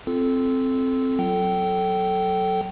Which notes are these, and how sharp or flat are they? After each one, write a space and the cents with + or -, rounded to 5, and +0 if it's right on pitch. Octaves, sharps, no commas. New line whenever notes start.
C4 +0 F4 -20 A4 -10
F#3 +0 A4 +0 G5 -25